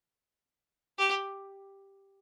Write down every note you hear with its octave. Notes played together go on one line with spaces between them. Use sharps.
G4